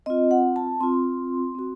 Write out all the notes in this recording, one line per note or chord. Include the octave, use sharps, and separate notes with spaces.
C4 F4 D#5
F#5
A5
C4 F4 C6
C4 F#4